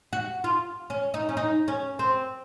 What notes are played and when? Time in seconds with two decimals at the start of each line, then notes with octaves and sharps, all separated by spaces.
0.13 F#4
0.44 F4
0.90 C#4
1.14 D#4
1.29 C#4
1.37 D#4
1.68 C#4
1.99 C4